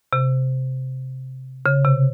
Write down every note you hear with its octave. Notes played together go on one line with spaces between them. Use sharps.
C3
C#3
C3